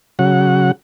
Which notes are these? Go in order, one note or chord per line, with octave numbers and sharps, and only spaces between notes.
C#3 F#3 F#5